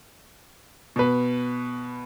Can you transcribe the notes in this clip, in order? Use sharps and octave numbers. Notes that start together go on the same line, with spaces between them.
B2 B4